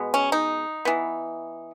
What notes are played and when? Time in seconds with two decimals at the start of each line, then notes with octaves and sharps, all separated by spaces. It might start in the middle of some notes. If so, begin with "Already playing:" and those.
Already playing: B2 G#3 B3
0.14 C#4
0.32 D#4
0.85 E3 B3